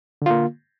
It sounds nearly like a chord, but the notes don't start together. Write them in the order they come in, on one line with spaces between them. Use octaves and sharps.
D3 F4 A#3